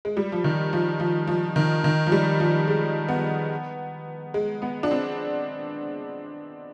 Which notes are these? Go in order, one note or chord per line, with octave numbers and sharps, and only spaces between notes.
G#3
G3
F3
D#3
F3
F3
F3
D#3
D#3
F3
G3
F3
G#3
B3
G#3
B3
D4
C4